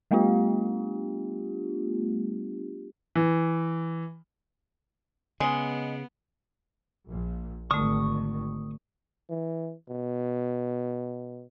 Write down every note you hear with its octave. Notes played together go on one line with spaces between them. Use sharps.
G3 A3 B3 D4 F4 G4
E3
C#3 G#3 B3 D#5
A#1 A#2
G#1 D3 D#3 A3 C#6 D#6
E3
B2